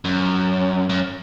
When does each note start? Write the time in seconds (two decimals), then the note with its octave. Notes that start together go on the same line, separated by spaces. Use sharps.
0.05 F#2
0.89 F#2